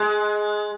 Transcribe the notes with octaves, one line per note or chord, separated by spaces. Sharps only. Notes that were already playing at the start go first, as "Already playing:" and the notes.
Already playing: G#3